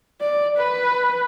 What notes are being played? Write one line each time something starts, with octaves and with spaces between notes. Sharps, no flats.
D5
B4